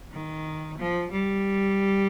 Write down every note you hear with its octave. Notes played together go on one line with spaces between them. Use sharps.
D#3
F3
G3